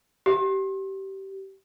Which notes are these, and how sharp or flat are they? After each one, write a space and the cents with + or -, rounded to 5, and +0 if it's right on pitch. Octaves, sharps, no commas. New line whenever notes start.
G4 -20